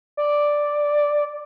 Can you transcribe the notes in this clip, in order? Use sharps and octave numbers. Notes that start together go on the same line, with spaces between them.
D5